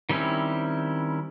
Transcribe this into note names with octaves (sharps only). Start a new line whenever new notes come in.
D#3 G3 C4 C#4 E4